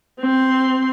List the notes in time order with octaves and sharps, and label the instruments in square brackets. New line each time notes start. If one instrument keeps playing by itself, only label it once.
[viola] C4 C6